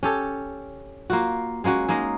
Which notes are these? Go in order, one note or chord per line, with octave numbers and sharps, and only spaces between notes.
C#4 G4 A4 C#5
A#3 F4 F#4
G#3 A#3 C#4 F#4
G#3 A#3 D#4 D#5